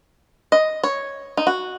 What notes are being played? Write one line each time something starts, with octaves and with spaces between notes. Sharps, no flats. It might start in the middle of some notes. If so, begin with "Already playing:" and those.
D#5
C#5
D#4
F#4